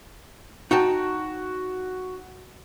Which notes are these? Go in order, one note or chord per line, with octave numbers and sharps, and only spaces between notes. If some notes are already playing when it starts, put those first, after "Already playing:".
D#4 F#4 G5 A5